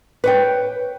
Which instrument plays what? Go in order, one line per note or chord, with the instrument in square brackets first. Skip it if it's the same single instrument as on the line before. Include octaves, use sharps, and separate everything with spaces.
[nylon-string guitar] B4 C#5 G5